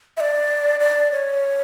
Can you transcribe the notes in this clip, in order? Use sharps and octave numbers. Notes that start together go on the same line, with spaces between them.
E5
D5
D5
C#5